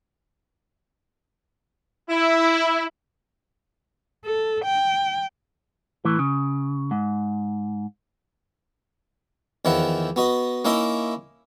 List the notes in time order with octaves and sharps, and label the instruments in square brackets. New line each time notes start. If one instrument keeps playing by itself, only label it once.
[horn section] E4
[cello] A4
G5
[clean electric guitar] A2 E3
C#3
G#2
[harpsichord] E2 D#3 F3 E4 F#5
B3 F#4 D#5
A#3 C#4 D#4 E4 D#5 E5